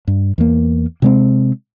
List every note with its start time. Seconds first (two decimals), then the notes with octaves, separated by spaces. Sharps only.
0.08 G2
0.38 E2 A#3
1.02 C3 G#3 C4